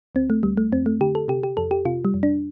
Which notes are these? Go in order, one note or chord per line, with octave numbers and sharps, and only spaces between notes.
D2 C4
A3
D2 G3
A3
F2 C4
A3
D3 G4
A4
C3 G4
G4
F2 A4
G4
C3 F4
G3
F2
D4